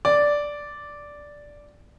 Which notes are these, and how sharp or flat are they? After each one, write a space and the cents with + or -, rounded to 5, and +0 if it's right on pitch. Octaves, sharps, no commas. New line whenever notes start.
D5 -5